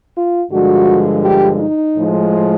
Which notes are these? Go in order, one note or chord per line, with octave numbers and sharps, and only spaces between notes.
F4
G2 D3 F3 G#3 F#4
G4
D#4
A2 F3 G#3